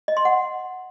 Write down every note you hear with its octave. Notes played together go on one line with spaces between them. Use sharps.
D#5
C6
F#5